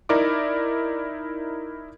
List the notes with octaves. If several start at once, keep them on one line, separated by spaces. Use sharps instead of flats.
D#4 E4 A#4 D5 D6